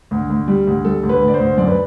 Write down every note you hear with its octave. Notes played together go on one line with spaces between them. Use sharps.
D2
D2
G3
D2
G3 A4
D2
B4
D2
D5
C5
D2
F#2 D5
B4